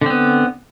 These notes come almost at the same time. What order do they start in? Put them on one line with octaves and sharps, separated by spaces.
D3 C4 B3